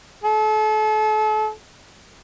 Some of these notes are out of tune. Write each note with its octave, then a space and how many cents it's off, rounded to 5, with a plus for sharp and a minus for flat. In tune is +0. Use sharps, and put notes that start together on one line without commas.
A4 -35